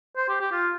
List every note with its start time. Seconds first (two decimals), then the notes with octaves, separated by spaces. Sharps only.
0.16 C5
0.29 G4
0.41 G4
0.52 F4